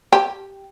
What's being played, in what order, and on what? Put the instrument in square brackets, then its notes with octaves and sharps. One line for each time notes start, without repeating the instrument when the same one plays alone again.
[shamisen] G4